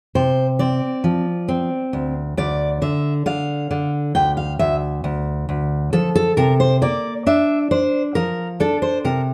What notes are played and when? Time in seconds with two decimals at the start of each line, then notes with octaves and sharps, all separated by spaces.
0.15 C3 C5
0.59 C4 D5
1.04 F3
1.48 C4
1.93 D2
2.37 D2 D5
2.82 D3 E5
3.26 D3 F5
3.71 D3
4.15 D2 G5
4.37 F5
4.59 D2 E5
5.04 D2
5.49 D2
5.93 F3 A4
6.15 A4
6.37 C3 A#4
6.60 C5
6.82 A#3 D5
7.27 D4 E5
7.71 D4 C5
8.15 F3 A#4
8.60 D4 A4
8.82 C5
9.05 C3 A#4